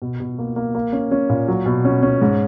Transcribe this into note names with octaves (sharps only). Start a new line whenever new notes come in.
B2
B2
A#3
A#3
A#3
C#4
C#4
A#2
F#3
B2
C#4
C#4
G#2